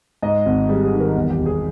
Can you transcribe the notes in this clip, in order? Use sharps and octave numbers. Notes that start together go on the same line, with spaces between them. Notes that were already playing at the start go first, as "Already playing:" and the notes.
G#2 D#5
G#1
G3 G#4
G#4
D#3
A#4
E2
G4
E1
G#4